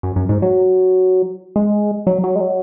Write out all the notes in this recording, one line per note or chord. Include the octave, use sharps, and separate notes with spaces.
F#2
F#2
G#2
F#3
G#3
F#3
F#3
G#3
F#3